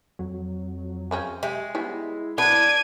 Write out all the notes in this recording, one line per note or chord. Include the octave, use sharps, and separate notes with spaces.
F2 F#3
C#3 C4 C#4
G#3 G4 E5
F#3 G3 B3 E4
B3 D4 F#4 B4 G#6 D#7